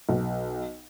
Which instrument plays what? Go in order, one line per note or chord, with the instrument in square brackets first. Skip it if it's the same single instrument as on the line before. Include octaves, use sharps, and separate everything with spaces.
[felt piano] B1